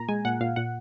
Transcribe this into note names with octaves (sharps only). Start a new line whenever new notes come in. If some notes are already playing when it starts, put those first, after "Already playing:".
Already playing: A#2 A#5
G#3 G#5
A#2 F#5
A#2 F5
A#2 F#5